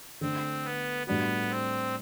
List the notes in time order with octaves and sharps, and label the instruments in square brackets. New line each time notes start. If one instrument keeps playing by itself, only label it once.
[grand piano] D3 A3 D4 [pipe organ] C4
[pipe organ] B3
[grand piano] A2 G3 D4 F#4 [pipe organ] B3
[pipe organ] C4